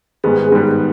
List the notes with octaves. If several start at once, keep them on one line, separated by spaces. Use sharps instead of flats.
G#2 D#3 G3 B3 G#4
G#2 D#3 G3 B3